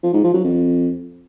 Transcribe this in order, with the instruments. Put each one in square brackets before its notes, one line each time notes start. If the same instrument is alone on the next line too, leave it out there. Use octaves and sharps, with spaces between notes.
[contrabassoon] F3
G#2
F3
F#3
F2